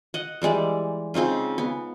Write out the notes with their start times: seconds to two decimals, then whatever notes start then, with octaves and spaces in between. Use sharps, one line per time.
0.14 D#5 F#5
0.42 E3 G3 G#3 D5
1.14 C#3 C4 D#4 F4
1.58 B3